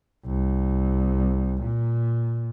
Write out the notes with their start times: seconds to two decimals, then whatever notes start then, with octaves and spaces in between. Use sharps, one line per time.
0.26 C2
1.62 A#2